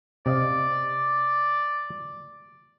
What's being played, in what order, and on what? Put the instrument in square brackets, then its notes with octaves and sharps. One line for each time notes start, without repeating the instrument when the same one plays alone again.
[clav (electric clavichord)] C3 D#5 F5 [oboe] D5